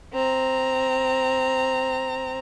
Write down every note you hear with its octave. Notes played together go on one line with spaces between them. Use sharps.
C4 A#5